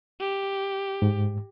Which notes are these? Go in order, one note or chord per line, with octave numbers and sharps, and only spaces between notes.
G4
G#2